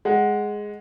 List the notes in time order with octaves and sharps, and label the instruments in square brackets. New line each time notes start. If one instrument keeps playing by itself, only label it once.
[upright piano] G#3 F#5